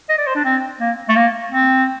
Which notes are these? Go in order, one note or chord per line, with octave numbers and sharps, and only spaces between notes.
D#5
D5
C5
D4
C4
A#3
A3
A#3
C4